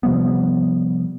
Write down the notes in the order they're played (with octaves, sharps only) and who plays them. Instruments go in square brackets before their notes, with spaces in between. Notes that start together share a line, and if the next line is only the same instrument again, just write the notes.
[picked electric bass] C3 F3 G3 B3